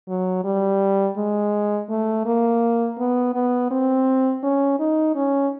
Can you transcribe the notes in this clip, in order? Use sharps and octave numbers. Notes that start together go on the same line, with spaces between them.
F#3
G3
G#3
A3
A#3
B3
B3
C4
C#4
D#4
C#4